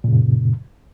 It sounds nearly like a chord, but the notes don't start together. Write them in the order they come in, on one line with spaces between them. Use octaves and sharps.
A#2 C#3 F#2